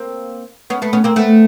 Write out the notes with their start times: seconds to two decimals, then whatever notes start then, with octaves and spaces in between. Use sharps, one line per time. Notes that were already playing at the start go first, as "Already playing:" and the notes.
Already playing: A#3 C4
0.70 B3 C#4
0.82 A3 B3
0.93 B3 C#4
1.04 A#3 C4
1.16 A3 B3